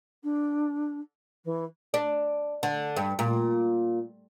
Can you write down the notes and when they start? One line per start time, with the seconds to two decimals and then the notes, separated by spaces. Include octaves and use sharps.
0.23 D4
1.44 E3
1.94 D4
2.63 D3
2.96 G2
3.19 A#2